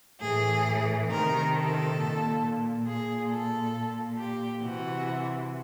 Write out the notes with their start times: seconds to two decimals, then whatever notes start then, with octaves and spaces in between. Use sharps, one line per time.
0.21 A2 E3 G#4
1.09 C3 D#3 A#4
1.53 A4
1.98 A#2
2.86 A#2 G#4
3.30 A4
3.75 A#2
4.19 G4
4.64 C3 E3 F#4